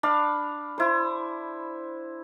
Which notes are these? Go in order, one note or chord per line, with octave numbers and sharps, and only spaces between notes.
D4 F5 B5
E4 C5